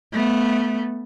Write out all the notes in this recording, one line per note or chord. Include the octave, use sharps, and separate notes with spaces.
A3 B3